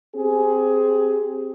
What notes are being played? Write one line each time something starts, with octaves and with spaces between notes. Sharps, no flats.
C4 G4 G#4